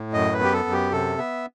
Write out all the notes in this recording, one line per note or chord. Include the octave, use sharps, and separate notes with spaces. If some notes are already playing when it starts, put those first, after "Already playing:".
Already playing: A2
F#2 D#5
B4
B3 G4
A4
F#2
G4
C3 A4
B3 E5